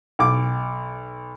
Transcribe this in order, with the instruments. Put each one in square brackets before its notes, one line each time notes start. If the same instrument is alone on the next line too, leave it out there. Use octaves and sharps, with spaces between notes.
[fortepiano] B1 D6